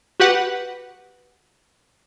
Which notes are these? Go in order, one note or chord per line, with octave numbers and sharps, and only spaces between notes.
F#4 G4 B4 F#5